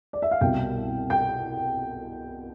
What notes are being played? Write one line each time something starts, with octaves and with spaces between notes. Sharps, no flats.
D5
E5
F5
C2 B2 G3 G5
G5